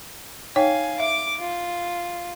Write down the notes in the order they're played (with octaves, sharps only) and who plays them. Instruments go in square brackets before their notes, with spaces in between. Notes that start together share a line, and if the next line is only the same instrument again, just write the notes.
[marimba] D#4 C#5 G5 [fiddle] F5 G#5
[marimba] E5 [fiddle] D6
[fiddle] F4